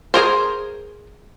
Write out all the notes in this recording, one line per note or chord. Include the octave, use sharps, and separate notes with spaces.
G#4 A#4 C5